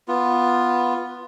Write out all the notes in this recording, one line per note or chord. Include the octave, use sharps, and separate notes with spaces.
B3 F4